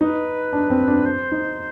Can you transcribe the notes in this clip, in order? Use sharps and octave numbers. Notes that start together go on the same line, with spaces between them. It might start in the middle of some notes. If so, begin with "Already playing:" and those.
D#4 B4
D4
C4
D4
C5
D#4